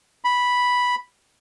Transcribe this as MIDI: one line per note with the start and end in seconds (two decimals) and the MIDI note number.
0.24 0.95 83